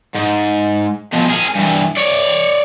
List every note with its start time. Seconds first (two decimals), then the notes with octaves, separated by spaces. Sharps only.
0.15 G#2
1.13 B2 F3
1.30 G#4 A#4
1.56 G2 E3
1.97 C#5 D5